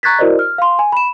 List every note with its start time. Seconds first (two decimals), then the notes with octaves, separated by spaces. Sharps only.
0.03 A#5 C#6 F#6 G#6 A6 B6
0.19 E4 F#4 A#4 C5 D5 D#5
0.39 F6
0.58 F5 C6
0.79 G#5
0.92 B5 E7